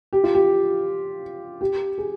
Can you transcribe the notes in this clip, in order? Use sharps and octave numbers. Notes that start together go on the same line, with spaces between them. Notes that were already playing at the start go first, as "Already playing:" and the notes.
G4
F4
G4
G4
G#4